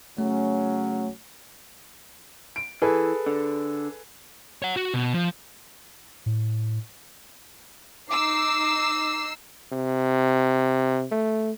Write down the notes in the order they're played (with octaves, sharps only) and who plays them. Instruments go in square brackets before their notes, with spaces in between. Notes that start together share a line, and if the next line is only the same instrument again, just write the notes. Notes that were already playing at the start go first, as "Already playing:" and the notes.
[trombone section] C#3 F#3 C#4 [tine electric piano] A3
[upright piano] D7
[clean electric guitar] E3 [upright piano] G#4 A4 B4
[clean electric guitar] D3
[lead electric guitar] C#5 F#5
F#4
B2
F3
[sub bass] A2
[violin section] D#4 E6 C7 [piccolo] D6
[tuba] C3
A3